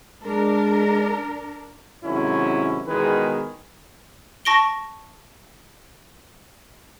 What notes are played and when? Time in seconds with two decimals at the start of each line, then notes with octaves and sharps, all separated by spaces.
0.24 G#3 D4 A#4
2.04 G#2 C3 D#3 F#3 C#4 E4
2.87 E2 B2 D#3 G#3 G#4 B4
4.45 A5 C#6 A#6 D7 G7